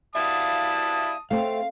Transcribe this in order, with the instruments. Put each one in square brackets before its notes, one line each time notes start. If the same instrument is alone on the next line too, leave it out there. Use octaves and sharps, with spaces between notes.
[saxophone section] G3 B3 E4 [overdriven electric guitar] E5 F5 [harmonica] A5 D#6
[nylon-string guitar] A3 C4 [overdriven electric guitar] F5